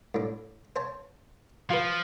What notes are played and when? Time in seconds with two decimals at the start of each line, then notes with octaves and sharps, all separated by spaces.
0.14 A2 D4
0.76 C5 C#5 A5
1.70 F3 F4 B4